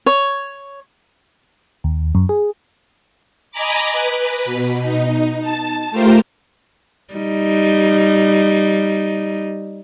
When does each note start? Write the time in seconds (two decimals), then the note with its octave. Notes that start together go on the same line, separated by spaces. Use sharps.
0.06 C#5
1.84 D#2
2.15 F#2
2.29 G#4
3.52 D#5 G#5 A#5 B5 D6
3.93 B4
4.45 B2
4.82 D#4
5.41 A5
5.91 A3 F4 G4 A#4 C5
7.14 G3 D#4